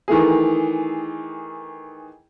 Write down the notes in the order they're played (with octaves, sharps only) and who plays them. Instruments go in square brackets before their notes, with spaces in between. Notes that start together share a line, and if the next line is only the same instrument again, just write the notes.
[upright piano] D#3 E3 A3 G#4